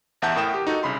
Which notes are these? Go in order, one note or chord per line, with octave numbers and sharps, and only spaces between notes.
A1 E2 E5 F#5 A5 G6
A2 A#4 G5 D#6 E7
G4
D#4 F#4 A4
C2 C#3 B5 C6